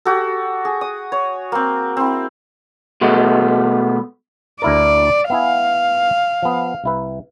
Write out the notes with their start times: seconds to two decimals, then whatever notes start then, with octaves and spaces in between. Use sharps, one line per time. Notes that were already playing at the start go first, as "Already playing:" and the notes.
0.05 F#4 G4 A4
0.65 G#4
0.81 D#6
1.12 C#5
1.52 A#3 C4
1.97 C4 E4
3.01 B2 G#3 A3 B3
4.62 D2 E4 A#4 D5
5.30 B3 E4 F5 G#5
6.42 F3 B3
6.84 C2 E4 B4